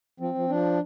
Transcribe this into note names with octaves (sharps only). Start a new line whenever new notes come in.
F3 C4
F3
F3 D4